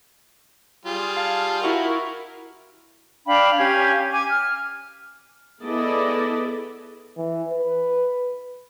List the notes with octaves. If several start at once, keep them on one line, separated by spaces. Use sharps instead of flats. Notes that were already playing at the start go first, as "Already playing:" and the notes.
G3 F4 G#4
F5 A5
E4 F#4 A#4
D4 F5 G5 B5
C#4 G4 F5 G#6
G#5 D6
F6
B3 E4 G#4 A4 D5 D#5
E3
B4